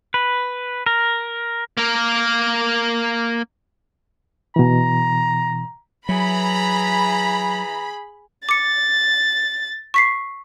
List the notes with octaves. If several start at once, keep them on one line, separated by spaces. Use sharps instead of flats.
B4
A#4
A#3 A#4
B2 E3 A#5
E3 F#3 G#4 A#5 B5
D6 A6 C#7
C#6 B6 C7